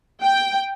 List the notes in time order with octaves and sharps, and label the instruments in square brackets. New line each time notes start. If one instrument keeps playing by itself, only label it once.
[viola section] G5